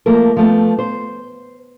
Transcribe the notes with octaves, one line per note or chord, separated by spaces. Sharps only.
F3 A3 A#3 A4 A#4
F3 A3 B3
C5